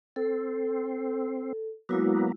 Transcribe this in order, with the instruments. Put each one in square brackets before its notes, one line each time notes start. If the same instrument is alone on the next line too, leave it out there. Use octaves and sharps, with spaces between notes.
[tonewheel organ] C4 [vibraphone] A4
[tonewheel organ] F#3 A#3 B3 [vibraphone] G#3 E4 F#4